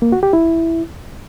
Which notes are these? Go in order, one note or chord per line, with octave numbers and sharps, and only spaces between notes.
A#3
F#4
G4
E4